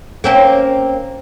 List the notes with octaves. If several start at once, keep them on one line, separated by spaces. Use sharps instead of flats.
A#3 C4 C#4